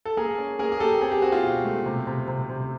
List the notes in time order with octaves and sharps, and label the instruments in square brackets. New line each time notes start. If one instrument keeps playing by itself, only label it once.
[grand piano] A4
A#3 G#4 A#4
C#4
A#3 G#4 A#4
G#4
A#3 G4 A4
C4 G#4
G4
C4 F#4
F4 G4
B2
A3
C3
C3
C3
C3